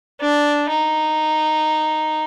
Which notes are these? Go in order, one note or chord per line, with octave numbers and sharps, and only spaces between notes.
D4
D#4